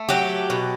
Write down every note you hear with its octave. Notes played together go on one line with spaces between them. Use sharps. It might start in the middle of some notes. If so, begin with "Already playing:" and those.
Already playing: A3
F#3 G4
B2